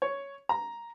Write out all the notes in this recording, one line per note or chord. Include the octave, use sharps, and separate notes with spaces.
C#5
A#5